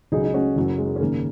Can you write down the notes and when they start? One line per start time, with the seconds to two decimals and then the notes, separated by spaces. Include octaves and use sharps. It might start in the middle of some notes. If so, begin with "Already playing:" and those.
0.12 C#2 C#3 F#3 D#4 G#4
0.24 D#4
0.34 C#4 F#4
0.56 F#1 F#2 F#3
0.78 G#3
0.96 C#4
1.00 G#1 F#2 C#3 A#3